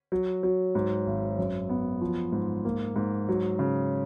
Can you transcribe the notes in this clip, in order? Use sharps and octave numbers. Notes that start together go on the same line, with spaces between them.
F#3
F#3
G#2
G#1
F#2
B3
F3
G#2
A#3
G#2
F#3
C#3